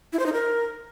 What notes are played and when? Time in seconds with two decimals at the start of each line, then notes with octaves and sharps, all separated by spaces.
0.13 E4
0.19 C5
0.26 D#4
0.33 A#4